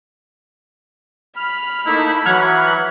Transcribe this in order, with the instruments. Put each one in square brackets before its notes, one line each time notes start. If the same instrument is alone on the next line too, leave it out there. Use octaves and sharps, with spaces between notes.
[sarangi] B5 [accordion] F6
[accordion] A3 A#3 D#4 [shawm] E4
[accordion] E3 F#3 [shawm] F#5 [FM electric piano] F6 G#6